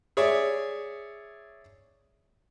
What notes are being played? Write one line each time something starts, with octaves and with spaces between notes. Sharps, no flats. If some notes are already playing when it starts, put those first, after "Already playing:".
G#4 C#5 D5 E5